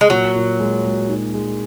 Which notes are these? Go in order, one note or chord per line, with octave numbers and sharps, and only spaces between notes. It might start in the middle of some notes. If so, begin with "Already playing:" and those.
G#3
A#2 F#3
A#2
G#3
G#3
D#4
G#3